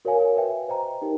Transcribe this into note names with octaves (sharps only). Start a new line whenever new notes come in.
F#4 A#4 C#5 F5 G#5
B4 E5 G5
C5 D#5 G5 A#5
D#4 G4 A#4